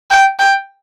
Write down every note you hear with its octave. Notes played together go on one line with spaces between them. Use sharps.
G5
G5